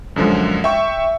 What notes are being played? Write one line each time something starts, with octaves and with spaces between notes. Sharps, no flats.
F#2 D3 F3 G#3
E5 G5 C#6